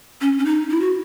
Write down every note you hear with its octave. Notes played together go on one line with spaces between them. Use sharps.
C#4
C#4
D#4
E4
F#4